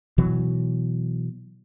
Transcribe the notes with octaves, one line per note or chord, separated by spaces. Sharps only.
B2 E3 F#3